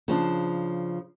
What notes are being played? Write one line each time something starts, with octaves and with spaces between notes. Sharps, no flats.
C#3 F3 D4